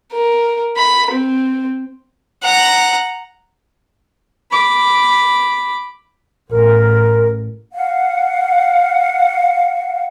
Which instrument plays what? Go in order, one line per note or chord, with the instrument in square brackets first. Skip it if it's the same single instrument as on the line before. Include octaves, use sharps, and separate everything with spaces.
[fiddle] A#4
B5
C4
F#5 A#5
[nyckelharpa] B5 D6
[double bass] A1 [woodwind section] A#4
[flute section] F5 F#5